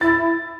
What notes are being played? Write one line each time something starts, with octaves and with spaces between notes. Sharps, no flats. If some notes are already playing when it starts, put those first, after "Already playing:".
E4 A6